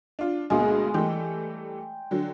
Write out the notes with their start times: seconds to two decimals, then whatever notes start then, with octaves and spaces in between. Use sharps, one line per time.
0.19 D4 F4
0.50 D2 B2 G#3 A#3
0.94 E3 G3 A3 G5
2.11 D3 F#3